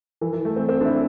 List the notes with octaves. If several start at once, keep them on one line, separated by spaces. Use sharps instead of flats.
E3
E3
A3
C4
C4
D4
E4